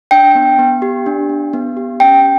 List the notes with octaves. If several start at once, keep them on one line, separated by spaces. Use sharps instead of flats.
D4 G5
B3
B3
G4
D4
B3
B3
G4
C#4 G5